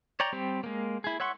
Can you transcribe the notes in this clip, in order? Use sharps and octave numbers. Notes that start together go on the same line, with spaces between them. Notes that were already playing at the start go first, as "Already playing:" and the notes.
C#5 D5 G5 A#5
G3 C4 G4
G#3 A#3
E4 G#4
C#5 E5 F#5 C6 C#6